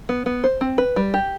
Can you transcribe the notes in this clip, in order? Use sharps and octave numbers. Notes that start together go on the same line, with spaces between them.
B3
B3
C5
C4
B4
G3
G4